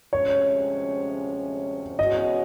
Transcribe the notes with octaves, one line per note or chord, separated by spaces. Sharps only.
D2 C3 F3 G#3 C#4 C#5
E2 B2 G#3 C#4 F#4 D#5